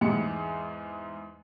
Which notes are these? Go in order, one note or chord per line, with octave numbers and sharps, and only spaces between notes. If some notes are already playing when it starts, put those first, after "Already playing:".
E2 G#2 G#3 C#7